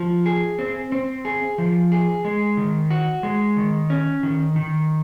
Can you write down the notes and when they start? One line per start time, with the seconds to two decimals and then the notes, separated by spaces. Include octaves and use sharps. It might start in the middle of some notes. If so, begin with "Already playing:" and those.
Already playing: F3
0.26 G#4
0.59 C4
0.92 C4
1.25 G#4
1.58 F3
1.92 G#4
2.25 G#3
2.57 D#3
2.91 F#4
3.23 G#3
3.57 D#3
3.90 C#4
4.23 D#3
4.56 D#3